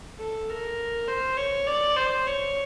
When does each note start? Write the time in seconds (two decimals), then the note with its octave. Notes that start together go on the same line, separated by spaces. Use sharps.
0.19 A4
0.49 A#4
1.08 C5
1.37 C#5
1.67 D5
1.96 C5
2.27 C#5